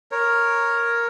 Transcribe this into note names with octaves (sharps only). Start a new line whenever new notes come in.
A#4 C#5